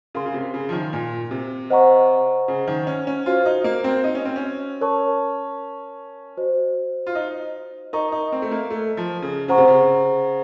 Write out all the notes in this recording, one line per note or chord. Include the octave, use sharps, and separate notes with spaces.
C#3 A#4 F5 C6
C#3
C3
C#3
F3
D#3
A#2
C3
C5 D#5 F#5 A#5 C#6
C#3
D#3
C#4
C#4
F4 F#4 C5 F5
D#4
A#3
C4
D#4
C#4
C4
C#4
A#4 C#5 A5 C#6
F#4 C5 D#5
F4
D#4
D#4 A#4 D#5 A#5 C#6
D#4
C4
A3
A#3
A3
F3
C#3
C#3 C5 F#5 A#5 C#6
C3
C#3